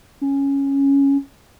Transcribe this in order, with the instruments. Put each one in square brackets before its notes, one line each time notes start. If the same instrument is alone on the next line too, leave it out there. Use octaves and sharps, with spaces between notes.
[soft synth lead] C#4